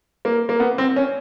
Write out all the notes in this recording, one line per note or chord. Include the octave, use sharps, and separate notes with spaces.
A#3
A#3
B3
C4
C#4